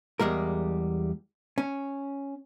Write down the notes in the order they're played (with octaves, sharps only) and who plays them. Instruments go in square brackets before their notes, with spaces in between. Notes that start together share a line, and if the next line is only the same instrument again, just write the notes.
[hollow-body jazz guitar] E2 G3 G#3 A#4
C#4